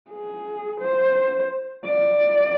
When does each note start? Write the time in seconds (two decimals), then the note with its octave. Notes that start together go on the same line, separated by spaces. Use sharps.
0.11 G#4
0.80 C5
1.85 D5